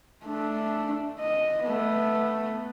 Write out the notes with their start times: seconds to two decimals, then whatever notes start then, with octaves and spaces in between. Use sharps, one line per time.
0.25 A3 D4
1.20 D#5
1.64 A3 B3